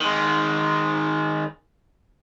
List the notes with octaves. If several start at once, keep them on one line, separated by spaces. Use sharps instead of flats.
D#3 G#3